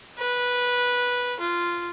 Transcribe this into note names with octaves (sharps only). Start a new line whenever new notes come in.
B4
F4